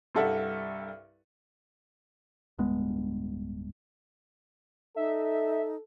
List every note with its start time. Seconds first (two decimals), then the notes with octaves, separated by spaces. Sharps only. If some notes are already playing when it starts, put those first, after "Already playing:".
0.15 C2 G2 A4 E5 F#5
2.58 D1 G2 G#3 B3
4.96 D#4 A4 E5